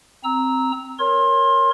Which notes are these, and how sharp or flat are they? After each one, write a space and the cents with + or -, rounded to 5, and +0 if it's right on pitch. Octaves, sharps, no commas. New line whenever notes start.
C4 +0 A#5 +0 E6 -20
A#4 +0 C#5 +0 C6 +25